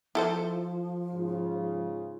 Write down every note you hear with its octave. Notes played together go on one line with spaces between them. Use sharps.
F3 E4 A4 C5
G#2 C#3 F4